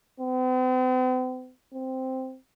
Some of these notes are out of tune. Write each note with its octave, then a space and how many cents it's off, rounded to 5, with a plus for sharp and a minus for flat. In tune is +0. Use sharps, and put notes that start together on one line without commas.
C4 -45
C4 -5